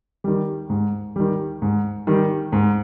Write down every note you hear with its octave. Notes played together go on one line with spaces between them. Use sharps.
D#3 G3
G#2
D#3 G3
G#2
D#3 G3
G#2